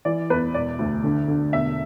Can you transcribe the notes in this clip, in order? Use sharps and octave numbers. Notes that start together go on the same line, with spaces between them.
E3 D5
E2 B4
E1 D5
D2
D3
D3
E1 E5